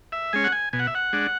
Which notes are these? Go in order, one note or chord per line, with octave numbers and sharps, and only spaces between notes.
E5
G#3 C#4 G#5
F#5
G#5
B2 G#5
F#5
E5
F#5
G#3 D4